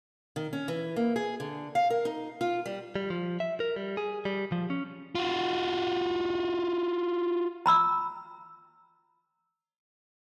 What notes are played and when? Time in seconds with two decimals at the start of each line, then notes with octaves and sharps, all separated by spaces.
0.36 D#3
0.53 C#4
0.68 E3
0.96 A#3
1.16 G#4
1.40 D3
1.75 F5
1.90 A#4
2.05 D#4
2.41 F4
2.66 G3
2.95 G3
3.10 F3
3.40 E5
3.60 A#4
3.76 G3
3.97 G#4
4.25 G3
4.52 F3
4.70 C#4
5.15 F4 F#4
7.66 A#5 B5 E6